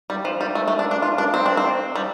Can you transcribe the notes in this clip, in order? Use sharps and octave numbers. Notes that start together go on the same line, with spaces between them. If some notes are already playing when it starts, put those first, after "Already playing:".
G3
F3
G3
A3
A3
D4
D4
F4
D4
C4
D4
C4
G3